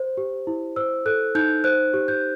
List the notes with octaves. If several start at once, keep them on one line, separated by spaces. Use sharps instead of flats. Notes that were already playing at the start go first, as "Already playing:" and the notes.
Already playing: C5
G4
E4
C5 E6
A4 F#6
D#4 G6
C5 F#6
G4
G6